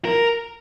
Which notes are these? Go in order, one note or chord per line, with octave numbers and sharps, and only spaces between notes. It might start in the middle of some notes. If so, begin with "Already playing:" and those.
A#4